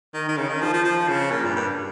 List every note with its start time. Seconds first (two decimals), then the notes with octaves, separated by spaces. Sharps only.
0.14 D#3
0.28 D#3
0.37 C#3
0.49 D#3
0.61 F3
0.73 F3
0.85 F3
1.08 C#3
1.32 A#2
1.45 G2
1.56 G2